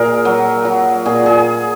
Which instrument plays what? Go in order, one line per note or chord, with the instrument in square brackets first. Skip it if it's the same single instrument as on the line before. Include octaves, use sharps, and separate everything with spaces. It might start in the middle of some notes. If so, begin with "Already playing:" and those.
Already playing: [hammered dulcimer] A#2 G#4 A#4
F#3
F#3
A#2 G#4
G#4